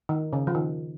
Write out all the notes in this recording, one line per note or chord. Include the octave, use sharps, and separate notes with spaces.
D#3
C#3
F3
D#3